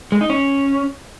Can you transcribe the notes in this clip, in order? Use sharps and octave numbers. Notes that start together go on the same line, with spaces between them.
G#3
D#4
C#4